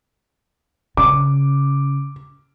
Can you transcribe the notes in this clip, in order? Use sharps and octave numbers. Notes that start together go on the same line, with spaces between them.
C#3 D6